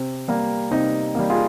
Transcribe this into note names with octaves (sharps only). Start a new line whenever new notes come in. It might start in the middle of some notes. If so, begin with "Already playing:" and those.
Already playing: C3
G3 A#3
C3 D#4
G3 A#3
F4 G#4